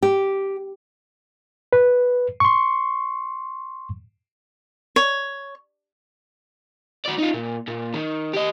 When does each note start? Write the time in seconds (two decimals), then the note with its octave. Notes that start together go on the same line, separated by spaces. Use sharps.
0.02 G4
1.73 B4
2.40 C6 C#6
4.96 C#5
7.05 F#4 D5
7.18 D#4 F4
7.34 A#2
7.68 A#2
7.94 D#3
8.34 G4 D#5